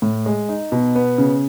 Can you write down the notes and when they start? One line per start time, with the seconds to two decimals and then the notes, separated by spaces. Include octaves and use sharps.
0.02 A2
0.26 G#3
0.49 D#4
0.72 B2
0.95 B3
1.18 C#3